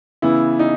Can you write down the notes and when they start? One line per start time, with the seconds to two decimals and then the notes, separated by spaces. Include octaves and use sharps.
0.22 C#3 E3 B3 E4
0.59 D#4